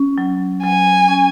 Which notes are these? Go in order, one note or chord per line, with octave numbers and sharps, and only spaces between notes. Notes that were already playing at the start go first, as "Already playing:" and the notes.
Already playing: C#4
F#3
F#3 G#5
C#4